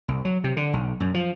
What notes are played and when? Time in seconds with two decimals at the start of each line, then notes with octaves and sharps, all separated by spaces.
0.08 C2
0.25 F#3
0.44 C3
0.57 D3
0.73 B1
1.00 F#2
1.14 F3